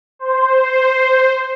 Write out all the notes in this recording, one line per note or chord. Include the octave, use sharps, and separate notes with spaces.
C5